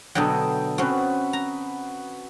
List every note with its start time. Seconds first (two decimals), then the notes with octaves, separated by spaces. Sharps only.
0.15 B2 D3 F#3 A4 D#5 G5
0.78 C4 C#4 F#4 B4
1.33 A#5